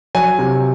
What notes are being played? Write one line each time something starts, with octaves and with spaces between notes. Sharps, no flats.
F#3 G#5
C3